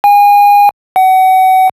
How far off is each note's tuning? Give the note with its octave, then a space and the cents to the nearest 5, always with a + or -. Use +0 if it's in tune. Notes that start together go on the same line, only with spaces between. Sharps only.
G#5 -30
F#5 +30